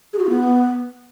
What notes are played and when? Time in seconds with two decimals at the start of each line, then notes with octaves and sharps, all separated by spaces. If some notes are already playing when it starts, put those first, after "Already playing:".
0.13 G#4
0.19 F#4
0.24 F4
0.30 B3